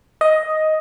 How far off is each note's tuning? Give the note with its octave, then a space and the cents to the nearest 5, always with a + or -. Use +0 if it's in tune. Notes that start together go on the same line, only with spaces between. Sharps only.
D#5 +5